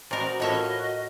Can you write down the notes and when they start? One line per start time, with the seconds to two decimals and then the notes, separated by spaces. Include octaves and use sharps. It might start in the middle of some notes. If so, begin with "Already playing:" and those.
0.11 A#2 F#4 A#4 C5 D#5 B5
0.40 A2 F4 A#4 C#5 D#5 E5